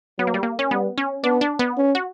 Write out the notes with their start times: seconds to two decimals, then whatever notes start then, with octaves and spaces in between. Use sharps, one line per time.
0.19 F#3 B3
0.27 A#3
0.34 G3
0.43 A#3
0.59 C#4
0.71 G3 B3
0.98 C#4
1.24 B3 D4
1.41 D4
1.59 B3
1.77 C#4
1.95 F#4